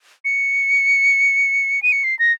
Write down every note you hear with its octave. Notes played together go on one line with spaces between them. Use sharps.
C#7
D#7
C#7
C7
A#6